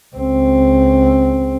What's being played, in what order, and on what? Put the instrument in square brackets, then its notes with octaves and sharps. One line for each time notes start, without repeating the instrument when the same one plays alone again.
[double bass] C#2 C4